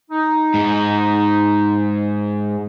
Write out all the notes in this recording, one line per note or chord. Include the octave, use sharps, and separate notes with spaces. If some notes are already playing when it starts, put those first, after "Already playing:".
D#4
G#2